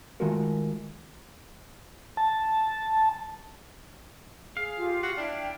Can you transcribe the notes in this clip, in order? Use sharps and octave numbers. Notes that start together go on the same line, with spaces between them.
D#3 G#3 A3 F4 F#4 A#4
A5
G#4 F5
F4 G4
F#4 F#6
D4 E4 G5